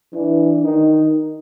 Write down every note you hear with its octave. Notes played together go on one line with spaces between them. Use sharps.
E3 D4
D#3 D#4